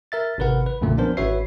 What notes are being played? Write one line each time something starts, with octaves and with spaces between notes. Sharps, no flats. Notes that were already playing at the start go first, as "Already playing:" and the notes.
A#4 E5 A6
G#1 C3 A#4 B4 F#5
B4
B1 F#2 A#2 D3 A3 A#3
F3 B3 C#4 D4 A#4 C5
G#1 F#4 B4 C#5 E5 C7